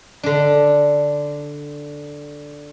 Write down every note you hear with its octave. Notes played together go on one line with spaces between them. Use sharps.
D3 D4